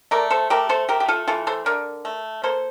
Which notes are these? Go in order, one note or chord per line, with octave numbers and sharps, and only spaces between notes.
A3 A#4 D5
A4 C5
A3 G4 A#4
A4 C5
A3 G4 A#4
G4
F4 A4
E3 F4 A4
A4 C5
D3 A#4 D5
A3
A#3 A4 C5